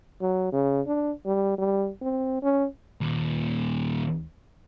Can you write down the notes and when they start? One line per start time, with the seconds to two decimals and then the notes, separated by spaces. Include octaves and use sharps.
0.21 F#3
0.52 C#3
0.87 D4
1.26 G3
1.58 G3
2.02 C4
2.43 C#4
3.01 D#2 A#2